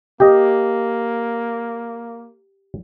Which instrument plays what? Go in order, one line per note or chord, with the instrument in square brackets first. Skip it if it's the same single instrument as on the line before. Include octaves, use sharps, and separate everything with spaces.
[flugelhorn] A#3 [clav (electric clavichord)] G4 D#5